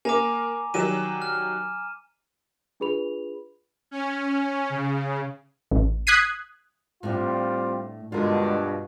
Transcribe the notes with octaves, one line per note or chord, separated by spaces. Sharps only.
A#3 G#5 A#5 D6
D#3 F#3 G3 D#7 E7
F6
D4 F4 G#4 B4 B5 F7
C#4
C#3
A1
D#6 F#6 G#6 B6 C7 D#7
A2 G3 A3 C4 D4 F4
G2 B2 D3 G#3 F4 F#4 A#4